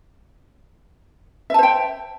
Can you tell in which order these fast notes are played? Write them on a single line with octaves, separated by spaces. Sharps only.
E5 A5 C5 G5